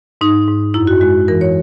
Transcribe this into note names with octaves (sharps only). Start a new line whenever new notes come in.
G#2 D#4
G#2
F#2 E4
F#4
G#3 F#4
E3 A#4
C#5